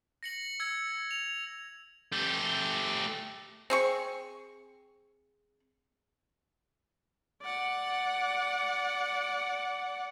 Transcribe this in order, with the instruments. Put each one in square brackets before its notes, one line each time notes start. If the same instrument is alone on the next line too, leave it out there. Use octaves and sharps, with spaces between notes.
[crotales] A#6 C#7 F#7
E6 G#6 C#7
F7
[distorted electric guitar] A3 G4
[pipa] C4 G#4 C#6
[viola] D5 F#5